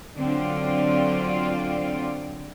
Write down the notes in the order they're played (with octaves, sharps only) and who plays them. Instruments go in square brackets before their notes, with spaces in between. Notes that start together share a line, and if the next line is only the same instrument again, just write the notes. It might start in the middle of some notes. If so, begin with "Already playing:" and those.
[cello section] D3 F#3 C4 F4 D5